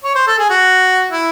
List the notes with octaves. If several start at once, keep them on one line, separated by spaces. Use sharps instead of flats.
C#5
C5
A4
G#4
F#4
E4